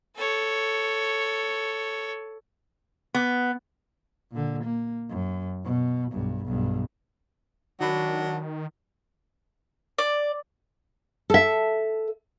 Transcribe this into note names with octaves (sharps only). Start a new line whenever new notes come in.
A4 C#5
B3
A#2 D3
A#3
F#2
B2
B1 G2
B1 G2
D#3 F#3 D4 F#4 B5
D5
A4 E5